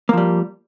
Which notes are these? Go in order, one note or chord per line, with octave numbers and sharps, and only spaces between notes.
F3 G3 A#3